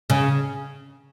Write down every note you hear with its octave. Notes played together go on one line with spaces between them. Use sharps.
C#3